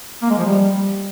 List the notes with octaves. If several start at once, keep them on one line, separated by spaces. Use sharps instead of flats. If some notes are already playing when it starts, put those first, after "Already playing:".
A#3
G#3
F3
G3